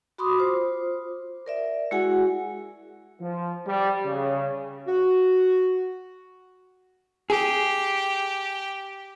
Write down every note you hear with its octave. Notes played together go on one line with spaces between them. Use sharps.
F#4 B5 C6 D6 D#6
F4 C5
A#4 D5 E5
G#3 E4 F#4 G#4 F#5 G#5
F3
G3
C#3
F#4
G4 G#4